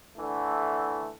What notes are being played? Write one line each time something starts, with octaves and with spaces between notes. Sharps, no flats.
D3 E3 A3